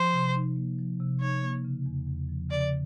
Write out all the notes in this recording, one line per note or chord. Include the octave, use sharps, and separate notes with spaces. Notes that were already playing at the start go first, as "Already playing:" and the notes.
Already playing: F3 C5
C3
D#4
A#3
F3
C3
D#4 C#5
A#3
C#3
E2
E2
F3
C#3 D5